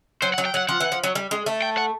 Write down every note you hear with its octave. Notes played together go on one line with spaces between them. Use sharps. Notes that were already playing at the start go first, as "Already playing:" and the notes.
F#3 C5
F#5
F#3
G5
F#3 F#5
F3 F#5
E3
F3
F#3
G3
G#3
A3
G5
F#5